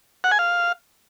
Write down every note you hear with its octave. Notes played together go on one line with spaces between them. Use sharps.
F#5
G#5
F5